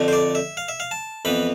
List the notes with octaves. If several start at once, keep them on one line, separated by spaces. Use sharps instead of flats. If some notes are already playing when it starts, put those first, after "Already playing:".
Already playing: F2 D3 A3
C5
D5
E5
F5
E5
F5
A5
F2 E3 B3 B5